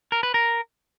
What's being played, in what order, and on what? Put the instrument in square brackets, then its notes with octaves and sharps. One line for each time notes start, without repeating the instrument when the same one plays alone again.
[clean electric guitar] A#4
B4
A#4